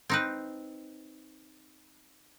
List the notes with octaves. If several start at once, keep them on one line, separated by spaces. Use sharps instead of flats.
C4 D#4 B4